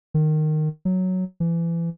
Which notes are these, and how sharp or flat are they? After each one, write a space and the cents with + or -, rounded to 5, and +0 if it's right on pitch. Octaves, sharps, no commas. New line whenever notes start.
D#3 -15
F#3 +0
E3 +30